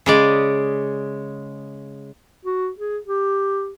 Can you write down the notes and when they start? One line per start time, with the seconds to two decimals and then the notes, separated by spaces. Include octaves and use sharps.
0.06 C#3 G#3 D5
2.46 F#4
2.79 G#4
3.07 G4